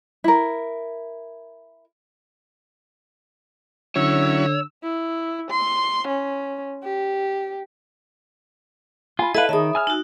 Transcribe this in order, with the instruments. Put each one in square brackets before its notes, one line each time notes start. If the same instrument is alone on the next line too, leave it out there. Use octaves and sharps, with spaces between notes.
[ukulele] E4 A#4
[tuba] D3 [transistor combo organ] F#3 C#4 E4 [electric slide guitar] C#5 [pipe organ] E6
[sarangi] E4
C6
C#4
G4
[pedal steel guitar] F4 [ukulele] G#5 B5
[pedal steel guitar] E4 B4 [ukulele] A4 F5 [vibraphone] D#5 A5
[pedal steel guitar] D#3 [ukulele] G#4 C#5 [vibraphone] E5 B5 D#6
[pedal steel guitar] G#5 E6 F6
[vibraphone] D#4 F#4